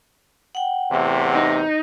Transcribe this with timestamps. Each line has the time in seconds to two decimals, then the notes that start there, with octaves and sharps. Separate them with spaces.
0.55 F#5 G5
0.92 E2 A2 C3
1.35 D#4